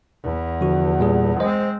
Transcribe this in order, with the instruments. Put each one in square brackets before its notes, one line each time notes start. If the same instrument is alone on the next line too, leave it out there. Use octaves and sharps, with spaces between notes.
[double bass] E2
[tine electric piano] D3 F3 F#4
A#2 G3 G#4
[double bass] G#3 C4 [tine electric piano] C5 D#5